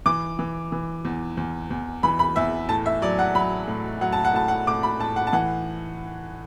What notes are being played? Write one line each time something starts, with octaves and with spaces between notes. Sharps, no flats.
E3 D6
E3
E3
E2
E2
E2
E3 B5
B5
E2 E5
A2 A5
E5
F#3 D5
F#5
F#3 B5
A2
F#3 F#5
A5
F#5
A2 A5
F#5
A2 D6
B5
A2 A5
F#5
A5
E3 F#5